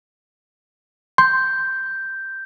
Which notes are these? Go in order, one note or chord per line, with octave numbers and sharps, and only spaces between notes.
C6 G6